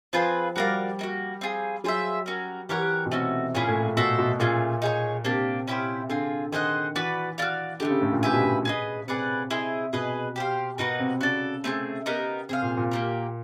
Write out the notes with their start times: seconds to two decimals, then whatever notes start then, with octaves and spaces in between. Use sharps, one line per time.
0.13 F3 C4 F4 G#4 B4
0.56 G3 F#4 A#4 D5 F5
0.99 A#3 D#4
1.03 F#4
1.41 C4 F4 G#4
1.84 F#3 F4 G#4 C5 E5
2.26 C#4 F#4 A#4
2.69 E3 G4 A#4 C#5 F#5
3.06 B2
3.12 C3 A3 C#4 F#4
3.54 A#2 C#4 E4 G#4 C#5
3.68 A2
3.83 A#2
3.97 B2 F#4 A4 C5 E5
4.19 B2
4.40 A#2 A3 C#4 F4 G#4
4.82 D#4 G#4 C#5
5.24 C3 A#3 D4 G4
5.67 C#4 E4 G4 C5
6.09 D3 C4 F4 G#4
6.52 D#3 G#4 C5 D#5 F#5
6.95 E3 F#4 B4 D5
7.38 F#4 A#4 D5 F5
7.80 D3 A3 D4 G4
7.91 C#3
8.02 A2
8.12 A#2
8.23 G4 B4 E5 G#5
8.33 B2
8.44 B2
8.65 G#4 B4 D#5
9.07 C3 G#4 B4 D5 F#5
9.50 E4 G#4 C5 D#5
9.93 B2 G#4 B4 D#5
10.36 G4 C5 F5
10.78 B2 A#3 D#4 F#4 B4
10.99 C3
11.21 C#3 F#4 A4 D5
11.64 A3 C4 E4 G#4
12.06 B3 D#4 G4 A#4
12.49 C3 G#4 C5 F5
12.62 A#2
12.77 A#2
12.91 A#3 D4 G4 A#4